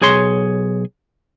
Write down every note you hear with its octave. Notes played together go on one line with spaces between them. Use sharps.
B1 G#4 C#5 C6